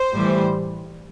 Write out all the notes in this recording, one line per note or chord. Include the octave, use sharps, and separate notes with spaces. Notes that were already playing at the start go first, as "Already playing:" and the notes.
Already playing: C5
A2 E3 G3